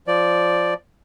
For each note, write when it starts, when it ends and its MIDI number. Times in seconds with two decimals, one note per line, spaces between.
0.07 0.74 53
0.07 0.74 74